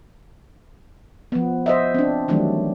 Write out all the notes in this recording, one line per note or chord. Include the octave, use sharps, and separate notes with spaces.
F3 B3
C5 D#5 E5
C4 D4
D#3 E3 F#3 G3 A3 D4